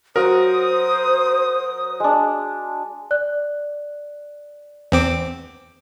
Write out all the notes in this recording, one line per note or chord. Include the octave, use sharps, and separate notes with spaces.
F#3 F#4 A#4 C5 F#5 D#6
G#3 D4
D5 F#6
E2 C4 D6